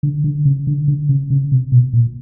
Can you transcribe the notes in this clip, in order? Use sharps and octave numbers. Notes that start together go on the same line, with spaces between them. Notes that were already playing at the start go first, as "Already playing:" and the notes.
D3
D3
C#3
D3
D3
C#3
C#3
C3
B2
A#2